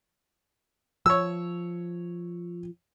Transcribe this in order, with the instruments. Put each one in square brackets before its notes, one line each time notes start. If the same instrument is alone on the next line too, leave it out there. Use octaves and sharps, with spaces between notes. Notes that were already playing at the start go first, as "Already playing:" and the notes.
[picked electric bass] F3 [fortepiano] C#5 E6